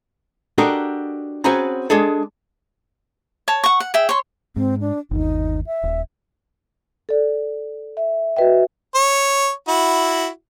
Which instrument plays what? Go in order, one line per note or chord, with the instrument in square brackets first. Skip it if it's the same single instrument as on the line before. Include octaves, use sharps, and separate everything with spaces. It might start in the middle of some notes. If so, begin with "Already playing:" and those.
[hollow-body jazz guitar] D4 F#4 G4 A4 A#4 D#5
C4 C#4 F#4 G#4 B4 A#5
G#3 D4 G#4 A4
[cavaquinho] C#5 A5
F#5 C#6
F#5
G#4 E5 G5
C#5 C6
[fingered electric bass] G#2 [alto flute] C4
[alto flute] D4
[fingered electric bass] G1 D#2 [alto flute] D#4
[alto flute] E5
[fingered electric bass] D#1
[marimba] A4 D5
[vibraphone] E5
[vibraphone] F#4 E5 [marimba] B4 D#5 G5
[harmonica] C#5
E4 F#4